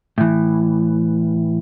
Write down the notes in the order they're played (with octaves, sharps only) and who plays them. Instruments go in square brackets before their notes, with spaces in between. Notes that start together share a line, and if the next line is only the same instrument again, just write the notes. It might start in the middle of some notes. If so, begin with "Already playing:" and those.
[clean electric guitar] A2 E3